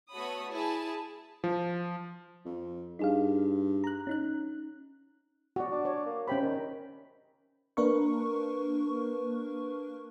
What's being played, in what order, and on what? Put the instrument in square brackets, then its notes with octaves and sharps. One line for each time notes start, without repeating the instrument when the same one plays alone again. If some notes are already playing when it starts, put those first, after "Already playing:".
[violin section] A3 B3 F#4 C#5 B5 D#6
E4 G#4 A5
[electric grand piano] F3
[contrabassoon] F2
[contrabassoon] G2 [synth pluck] D#4 G#4 F5
[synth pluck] A#5 F#6
C#4 D#4 F#6
[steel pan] F#4 D5
[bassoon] D4
[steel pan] C#5
[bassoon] A#3
[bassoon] C3 [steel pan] C#4 G5 B5
[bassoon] D#3
[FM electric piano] A#3 D4 A#4 B4 C#6